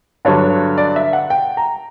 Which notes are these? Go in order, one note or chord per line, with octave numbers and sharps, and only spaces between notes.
G2 D3 F#3 C#5
D5
E5
F#5
G5
A#5